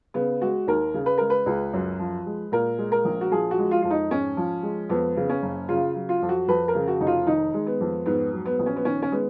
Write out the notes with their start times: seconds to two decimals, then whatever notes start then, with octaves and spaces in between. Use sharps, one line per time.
0.14 C#3 B3
0.42 G#3 F#4
0.67 D#2 A#4
0.94 C#3
1.06 B4
1.18 G#3 A#4
1.30 B4
1.46 C#2
1.73 F#2
1.99 F3
2.26 G#3
2.52 A#2 A#4
2.78 G#3
2.92 A#4
3.05 A#1
3.21 F#4
3.32 F3 G#4
3.51 F#4
3.58 G#3
3.71 F4
3.82 F2 F4
3.90 D#4
4.10 G#2 C#4
4.37 F3
4.63 G#3
4.89 F2 B3
5.16 C#3
5.29 C#4
5.42 F#1
5.69 C#3 F4
5.95 F#3
6.09 F4
6.22 F2
6.29 F#4
6.48 F2 B4
6.68 A#4
6.75 C#3
6.88 F#4
7.00 F1 D#4
7.07 F4
7.27 D#3 D#4
7.54 G#3
7.67 B3
7.80 F2
8.06 G#2 B3
8.33 F#3
8.45 B3
8.59 A#1
8.66 C#4
8.76 B3
8.85 D#3 C#4
9.02 C#4
9.12 G#3 B3